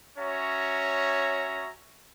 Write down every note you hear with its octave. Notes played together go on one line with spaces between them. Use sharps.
C#4 F#4 C#5 E5 A#5